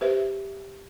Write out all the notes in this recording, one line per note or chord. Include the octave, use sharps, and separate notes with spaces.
G4 B4 C5 E5